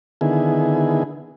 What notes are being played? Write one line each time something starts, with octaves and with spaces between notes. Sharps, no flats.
D3 D#3 B3 E4 G#4